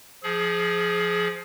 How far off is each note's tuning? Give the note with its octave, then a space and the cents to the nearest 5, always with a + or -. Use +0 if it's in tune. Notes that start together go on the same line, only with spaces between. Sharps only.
F3 +0 G#4 +20